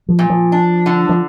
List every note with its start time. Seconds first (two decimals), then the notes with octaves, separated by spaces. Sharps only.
0.08 F3
0.19 A#2
0.30 F3
0.52 D4
0.86 D3
1.09 F3